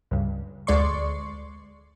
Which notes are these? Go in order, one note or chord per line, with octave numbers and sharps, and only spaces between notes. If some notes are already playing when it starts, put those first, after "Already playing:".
C#2 G2
D2 G#3 D5 C6 C#6